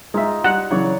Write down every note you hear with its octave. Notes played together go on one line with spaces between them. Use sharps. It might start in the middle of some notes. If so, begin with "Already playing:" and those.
G#3 D#4 F4 E5
G3 F#5 F#6
C#3 E3 F#3 C#5 D5